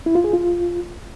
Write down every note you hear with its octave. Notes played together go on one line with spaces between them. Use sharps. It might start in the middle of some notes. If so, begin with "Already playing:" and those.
E4
F4
G#4
F4